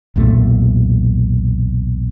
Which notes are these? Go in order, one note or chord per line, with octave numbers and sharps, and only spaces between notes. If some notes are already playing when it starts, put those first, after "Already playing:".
B1 E2 A#2 A3